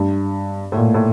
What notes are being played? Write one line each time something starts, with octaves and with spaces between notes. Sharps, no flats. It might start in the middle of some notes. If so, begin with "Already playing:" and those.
Already playing: G2
A2
A#2
A2